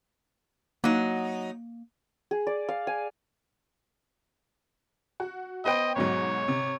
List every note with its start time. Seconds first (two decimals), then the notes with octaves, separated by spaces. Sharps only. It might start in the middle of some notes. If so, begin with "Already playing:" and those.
0.84 F#3 A#3 D#4
2.31 G#4
2.47 D5
2.69 F5
2.87 G#5
5.20 F#4
5.65 B3 C5 D#5 G5
5.96 B1 G#2 F#3 C#5
6.48 C3